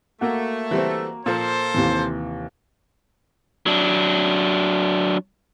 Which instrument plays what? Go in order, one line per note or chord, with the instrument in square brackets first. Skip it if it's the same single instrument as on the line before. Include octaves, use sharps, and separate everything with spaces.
[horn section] A3 [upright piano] A#3 F#4
[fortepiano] E3 G3 C4
[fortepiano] A#2 F3 [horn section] A#3 A4 C5
[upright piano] D#2 C3 E3
[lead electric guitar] F#3 D4